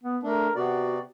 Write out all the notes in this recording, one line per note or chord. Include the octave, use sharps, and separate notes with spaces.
B3
A3 D4 A#4
C3 B3 F#4 D5